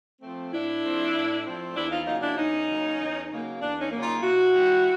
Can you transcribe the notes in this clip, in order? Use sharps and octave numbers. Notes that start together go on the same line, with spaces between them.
F3 A3 C4
A2 D4 E4
F3 A3 C4
A2
F3 A3 C4
E2 D4 E4
D#4 F4
C#3 F#3 A#3 D#4 F4
D4 E4
E2 C#4 D#4
C#3 F#3 A#3
E2
C#3 F#3 A#3
E2 D4
C#4 D#4
C#3 F#3 A#3
D#4 F4
C3 E4 F#4
D#3 G3